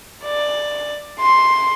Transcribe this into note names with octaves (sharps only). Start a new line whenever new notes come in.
D5
C6